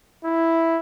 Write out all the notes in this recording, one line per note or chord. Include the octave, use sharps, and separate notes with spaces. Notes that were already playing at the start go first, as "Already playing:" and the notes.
E4